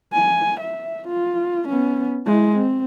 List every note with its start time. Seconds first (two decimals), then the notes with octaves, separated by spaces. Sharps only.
0.13 G#5
0.60 E5
1.08 F4
1.68 B3 C#4
2.27 G#3 E4
2.56 C4